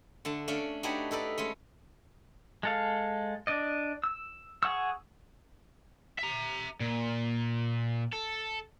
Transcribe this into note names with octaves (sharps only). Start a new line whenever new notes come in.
D3 A3 A5
A3 C#4 D4 D5 F5
D4 D#4 F#4 G4 B4 C#5
D#4 A4 B4 D5
G#3 A3 C#4
G#3 A4 F5
D4 D5 D#5
E6
G#4 F#5 C#6 E6
E5 A#5
A#2
A4